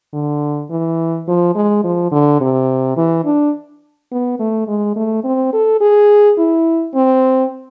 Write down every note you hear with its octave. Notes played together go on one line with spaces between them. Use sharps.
D3
E3
F3
G#3
F3
D3
C3
E3
D4
B3
A3
G#3
A3
C4
A4
G#4
E4
C4